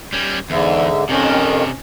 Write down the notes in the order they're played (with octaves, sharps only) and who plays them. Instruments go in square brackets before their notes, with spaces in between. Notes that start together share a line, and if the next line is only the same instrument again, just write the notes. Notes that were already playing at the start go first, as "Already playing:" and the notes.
[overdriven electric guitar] G3 C#4
[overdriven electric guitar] E2 [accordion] G#2 D3 [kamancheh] E5
[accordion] F2 D#3 [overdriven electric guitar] C3 D4 [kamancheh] C#4 D#5